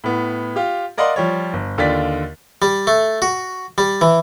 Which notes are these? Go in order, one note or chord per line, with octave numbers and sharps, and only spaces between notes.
A2 B3
F4 G4
A#4 D5 D#5 F5 F#5 C6
F3 G3 C#5
G1
D#2 D3 F4 D5 A6 B6
G3
A3
F#4
G3
E3